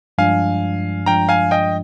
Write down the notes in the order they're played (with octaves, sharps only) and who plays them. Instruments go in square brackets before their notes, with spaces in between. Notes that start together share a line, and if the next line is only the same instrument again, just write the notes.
[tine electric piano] G2 F3 G#3 D4 [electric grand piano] F5 G#5
[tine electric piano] G2 F3 G#3 D4 [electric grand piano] G5 A#5
[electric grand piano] F5 G#5
D#5 G5